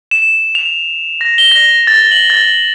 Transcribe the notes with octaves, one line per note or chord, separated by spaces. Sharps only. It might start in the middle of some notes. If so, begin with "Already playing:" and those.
E7
F7
A#6
G7
A#6
A6
F#7
A6